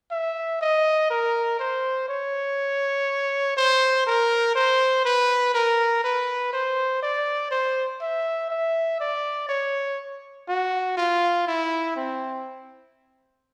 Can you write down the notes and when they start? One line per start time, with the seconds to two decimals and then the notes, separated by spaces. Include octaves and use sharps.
0.11 E5
0.61 D#5
1.11 A#4
1.60 C5
2.09 C#5
3.57 C5
4.07 A#4
4.55 C5
5.05 B4
5.54 A#4
6.04 B4
6.53 C5
7.03 D5
7.51 C5
8.02 E5
8.51 E5
9.00 D5
9.49 C#5
10.48 F#4
10.97 F4
11.47 E4
11.96 C4